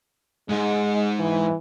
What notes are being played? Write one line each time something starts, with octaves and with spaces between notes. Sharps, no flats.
G#2 G#3
E3